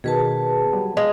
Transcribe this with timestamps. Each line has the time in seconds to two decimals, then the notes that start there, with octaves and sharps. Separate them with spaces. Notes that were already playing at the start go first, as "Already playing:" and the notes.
0.04 B2 D#3 G#4 B4 A5
0.73 F#3 G3 B3
0.97 G#3 F5